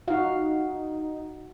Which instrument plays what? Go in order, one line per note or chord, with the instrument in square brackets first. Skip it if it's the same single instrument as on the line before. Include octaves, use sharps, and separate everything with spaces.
[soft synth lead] D#4 [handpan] F#4 F5